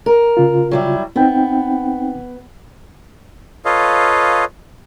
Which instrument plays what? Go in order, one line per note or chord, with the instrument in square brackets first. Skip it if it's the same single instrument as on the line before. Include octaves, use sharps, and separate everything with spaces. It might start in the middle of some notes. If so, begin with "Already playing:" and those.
[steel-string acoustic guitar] A#4
[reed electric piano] C#3 F4
[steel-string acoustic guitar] F#3 G3 E4
[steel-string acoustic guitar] B3 [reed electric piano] C4 D#4 G5
[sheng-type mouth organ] F4 A4 B4 C#5 D#5 F5